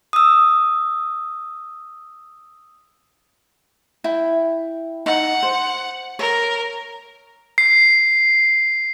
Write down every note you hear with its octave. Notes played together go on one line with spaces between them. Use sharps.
D#6 E6
E4 G5
D#4 F#5
C5
A#4 C#5
C7